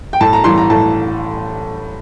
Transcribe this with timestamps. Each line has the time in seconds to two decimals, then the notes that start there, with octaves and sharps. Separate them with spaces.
0.13 G5
0.21 A2 A5
0.33 A#5
0.44 E3 G3 C6
0.58 A#5
0.70 A2 A5